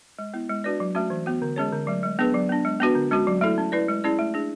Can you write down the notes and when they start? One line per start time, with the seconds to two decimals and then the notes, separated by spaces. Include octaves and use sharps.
0.19 G#3
0.34 B3 E4
0.49 G#3
0.64 D4 F#4 B4 D5
0.80 F#3
0.95 A3 C#4 F#4
1.10 E3
1.26 B3 F#4
1.42 D3
1.56 G#3 C#4 G#4 C#5
1.72 D3
1.87 F#3 A3
2.03 G#3
2.19 B3 D4 G#4 B4
2.34 F#3
2.49 B3 D4
2.65 G#3
2.80 B3 D4 F#4 B4
2.95 D3
3.11 G#3 C#4 F#4
3.27 F#3
3.41 A3 E4 A4
3.58 C#4
3.72 E4 B4 D5
3.89 G#3
4.04 C#4 E4 G#4 D5
4.19 A3
4.34 D4 G#4